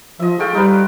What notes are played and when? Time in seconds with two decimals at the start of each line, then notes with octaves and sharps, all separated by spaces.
0.19 F3 D#5 E5
0.39 A3 F4 G#4 G5
0.55 G3 D#4 B4